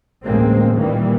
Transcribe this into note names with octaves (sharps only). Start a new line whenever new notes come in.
A1 D2 G#3 A#3 C4
A#2 D#3 E3 G3 A#3